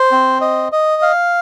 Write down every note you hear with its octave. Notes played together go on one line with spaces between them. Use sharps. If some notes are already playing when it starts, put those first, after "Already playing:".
Already playing: C5
C4
D#5
D#5
F5